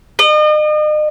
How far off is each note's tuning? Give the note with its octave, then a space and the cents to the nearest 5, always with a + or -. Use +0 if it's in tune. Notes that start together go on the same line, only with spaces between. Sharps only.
D#5 -40